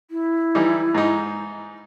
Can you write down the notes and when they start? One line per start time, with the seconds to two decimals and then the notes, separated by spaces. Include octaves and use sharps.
0.11 E4
0.55 E3 G3 D#4
0.94 G#2 D#4